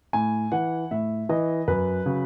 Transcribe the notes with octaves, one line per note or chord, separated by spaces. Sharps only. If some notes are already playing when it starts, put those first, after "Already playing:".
A2 G#5
E3 F#5
A2 E5
E3 D#5
F#2 B4
C#3 F#3